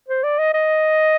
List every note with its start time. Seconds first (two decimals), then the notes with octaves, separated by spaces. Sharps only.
0.08 C5
0.24 D5
0.39 D#5
0.54 D#5